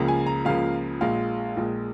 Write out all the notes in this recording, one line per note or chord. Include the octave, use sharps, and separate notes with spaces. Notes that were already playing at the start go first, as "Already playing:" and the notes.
Already playing: C#2 C#3 F3 A#3
G#5
A#5
C#2 C#3 F3 A#3 F5
A#1 A#2 G#3 F5
A#1 A#2 G#3